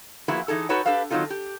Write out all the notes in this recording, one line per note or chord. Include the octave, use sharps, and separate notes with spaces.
F3 A#3 B3 E4 F#4 G#4
E3 D#4 G#4 A4
D#4 F#4 A4 B4 C#5 F#5
D4 G4 A4 B4 F5
D#3 F#3 C4 D#4 F4 A4
G4